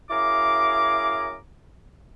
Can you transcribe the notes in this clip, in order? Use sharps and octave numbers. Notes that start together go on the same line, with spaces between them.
F#2 E4 G#4 F5 A#5 D6